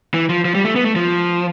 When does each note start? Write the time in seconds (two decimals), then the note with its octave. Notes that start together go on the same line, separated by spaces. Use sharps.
0.14 E3
0.30 F3
0.45 F3
0.55 G3
0.65 A3
0.76 B3
0.85 A3
0.96 F3